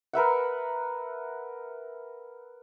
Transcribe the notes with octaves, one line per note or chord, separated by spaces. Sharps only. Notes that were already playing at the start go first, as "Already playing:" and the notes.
A#4 B4 E5 F#5